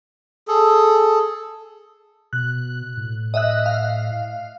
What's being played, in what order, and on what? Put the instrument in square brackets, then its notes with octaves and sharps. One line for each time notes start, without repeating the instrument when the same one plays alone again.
[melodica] G#4 A4
[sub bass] B2 [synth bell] F#6
[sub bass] A2
[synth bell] D#5 E5 F#6
F5